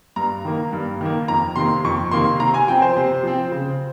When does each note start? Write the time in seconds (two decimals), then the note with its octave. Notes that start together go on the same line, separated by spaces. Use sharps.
0.16 G2 A#5
0.45 D#3 A#3
0.73 G2
1.01 D#3 A#3
1.28 F2 A#5
1.56 C3 D#3 A#3 C6
1.84 F2 C#6
2.11 C3 D#3 A#3 C6
2.40 C3 A#5
2.54 G#5
2.68 F3 C4 G5
2.82 C5
2.96 C3
3.23 F3 C4
3.51 C#3